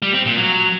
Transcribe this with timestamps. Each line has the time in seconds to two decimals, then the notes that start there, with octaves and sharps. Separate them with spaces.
0.02 G3
0.14 C4
0.25 A#2
0.37 F#3